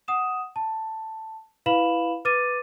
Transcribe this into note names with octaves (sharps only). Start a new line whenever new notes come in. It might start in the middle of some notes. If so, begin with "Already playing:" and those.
F#5 D#6 E7
A5
E4 B4 F5 B5 E7 F#7
B4 D6 A6 D#7